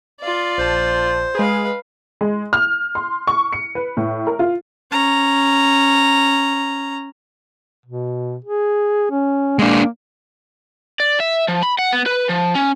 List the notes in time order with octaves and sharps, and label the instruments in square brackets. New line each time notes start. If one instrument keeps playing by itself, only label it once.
[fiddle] F4 D5
[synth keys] A#1 A5 [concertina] C5
[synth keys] G#3 G#4 [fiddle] B4 F5
[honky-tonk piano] G#3
F6
C6
C#6
C#7
B4
A2
A#4
F4
[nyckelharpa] C#4 A#5
[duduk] B2
G#4
C#4
[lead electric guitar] G#3 D4 [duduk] A#3
[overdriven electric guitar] D5
E5
F3
B5
F#5
B3
B4
F3
C#4